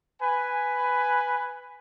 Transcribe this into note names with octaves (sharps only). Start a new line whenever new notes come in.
B4 G#5